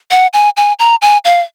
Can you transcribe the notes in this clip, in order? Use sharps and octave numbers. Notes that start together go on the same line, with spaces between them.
F#5
G#5
G#5
A#5
G#5
F5